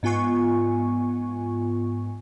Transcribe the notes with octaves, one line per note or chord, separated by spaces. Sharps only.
G#2 B3 F4 G#5 C#6